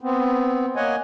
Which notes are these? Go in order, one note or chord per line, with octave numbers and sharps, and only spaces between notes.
B3 C4
A#3 C#5 D#5 F#5 G#5